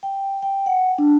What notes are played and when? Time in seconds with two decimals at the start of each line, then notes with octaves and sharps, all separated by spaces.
0.03 G5
0.43 G5
0.66 F#5
0.98 D4